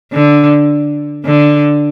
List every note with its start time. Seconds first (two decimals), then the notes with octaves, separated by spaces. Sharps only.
0.13 D3
1.26 D3